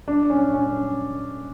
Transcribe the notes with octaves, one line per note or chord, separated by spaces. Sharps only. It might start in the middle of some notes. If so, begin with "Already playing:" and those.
D4
C#4
C#4